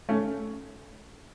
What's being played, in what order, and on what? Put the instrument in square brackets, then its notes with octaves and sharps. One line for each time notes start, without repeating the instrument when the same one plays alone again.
[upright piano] A3 C#4